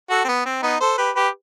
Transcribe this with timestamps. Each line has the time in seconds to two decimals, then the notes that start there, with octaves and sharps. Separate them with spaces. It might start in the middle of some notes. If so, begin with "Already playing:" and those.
0.10 F#4 A4
0.24 C4
0.28 B3
0.46 C4
0.63 B3 D#4
0.81 A4 C5
0.98 G4 B4
1.16 G4 B4